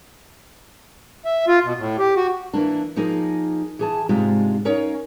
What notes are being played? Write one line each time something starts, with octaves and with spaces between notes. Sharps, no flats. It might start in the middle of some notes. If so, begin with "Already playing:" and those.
E5
F4
B2
A2
G4
F#4
E3 A#3 D4
F3 A#3 D#4 G#4 D#5
E3 G#4 A5
G#2 C3 G#3 D4 F4
C#4 D#4 A#4 C#5 F5